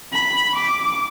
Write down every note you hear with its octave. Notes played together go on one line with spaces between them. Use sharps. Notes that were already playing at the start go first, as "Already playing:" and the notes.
B5
D6